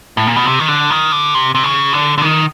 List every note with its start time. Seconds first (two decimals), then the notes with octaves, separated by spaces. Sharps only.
0.17 A2
0.27 A#2
0.36 B2
0.46 C3
0.59 D#3
0.68 D3
0.90 D#3
1.12 D3
1.34 C3
1.55 C3
1.63 C#3
1.93 D3
2.18 D3
2.22 D#3